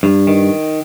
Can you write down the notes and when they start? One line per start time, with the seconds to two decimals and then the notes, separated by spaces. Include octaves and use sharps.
0.03 G2
0.27 D#3